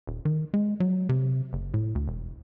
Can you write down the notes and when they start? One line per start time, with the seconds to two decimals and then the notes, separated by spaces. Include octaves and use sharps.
0.07 D#1
0.25 D#3
0.54 G#3
0.80 F#3
1.09 C3
1.53 F#1
1.74 A2
1.95 D2
2.08 E1